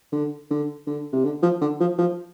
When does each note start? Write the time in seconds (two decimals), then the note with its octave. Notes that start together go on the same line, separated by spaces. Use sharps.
0.12 D3
0.50 D3
0.87 D3
1.13 C3
1.25 D3
1.43 F3
1.61 D3
1.80 F3
1.98 F3